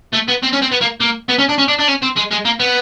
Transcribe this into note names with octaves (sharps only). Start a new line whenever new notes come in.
A3
B3
C4
C#4
C4
B3
A#3
A#3
B3
C#4
D4
C#4
D4
D4
C#4
C4
G#3
G#3
A#3
B3